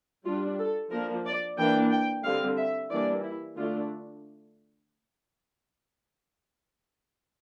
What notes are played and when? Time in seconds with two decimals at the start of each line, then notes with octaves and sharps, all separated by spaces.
0.25 G3 D4 F4
0.58 A4
0.91 F3 A#3 D4 A#4
1.25 D5
1.58 E3 A#3 D4 G5
1.91 G5
2.24 D3 G3 C4 F5
2.57 E5
2.90 E3 G3 A#3 D4 D5
3.23 E4
3.57 D3 A3 D4 F4